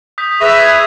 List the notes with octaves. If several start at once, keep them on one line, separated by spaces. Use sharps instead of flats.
D#6 G6 B6
G#4 B4 E5 C#6 A#6 F7
G#6